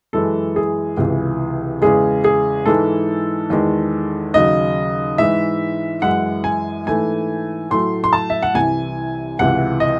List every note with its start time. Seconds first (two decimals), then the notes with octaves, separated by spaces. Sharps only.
0.13 F#2 E3 G#3 A4
0.56 G#4
0.97 C#2 C3 E3
1.82 E2 C#3 G#3 G#4
2.24 G#4
2.66 G#2 E3 G#3 A4
3.50 E2 D#3 G#3
4.34 D#2 C#3 F#3 D#5
5.18 G#2 E3 G#3 E5
6.02 F#2 E3 G#3 F#5
6.44 G#5
6.86 G#2 E3 A3 G#5
7.70 A2 F#3 A3 C6
8.04 C6
8.13 A5
8.30 E5
8.43 F#5
8.54 C2 C3 E3 G#5
9.39 C#2 C3 E3 F#5
9.80 D#5